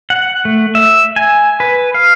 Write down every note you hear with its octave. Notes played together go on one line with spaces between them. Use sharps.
F#5
A3
E5
G#5
B4
F5